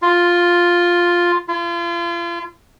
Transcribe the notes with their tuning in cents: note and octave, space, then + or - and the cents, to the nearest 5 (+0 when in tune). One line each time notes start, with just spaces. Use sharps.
F4 +5
F4 -35